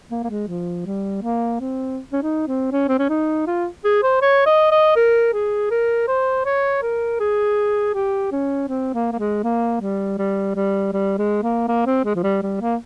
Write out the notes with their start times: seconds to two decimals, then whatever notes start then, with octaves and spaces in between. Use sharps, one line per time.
0.11 A#3
0.24 A#3
0.29 G#3
0.48 F3
0.86 G3
1.22 A#3
1.60 C4
2.12 C#4
2.23 D#4
2.47 C4
2.72 C#4
2.88 C4
2.99 C#4
3.09 D#4
3.47 F4
3.84 G#4
4.03 C5
4.21 C#5
4.46 D#5
4.71 D#5
4.96 A#4
5.33 G#4
5.71 A#4
6.08 C5
6.45 C#5
6.82 A#4
7.20 G#4
7.94 G4
8.32 C#4
8.68 C4
8.94 A#3
9.12 A#3
9.19 G#3
9.43 A#3
9.81 G3
10.18 G3
10.55 G3
10.93 G3
11.18 G#3
11.43 A#3
11.68 A#3
11.86 C4
12.05 G#3
12.15 F3
12.23 G3
12.42 G3
12.61 A#3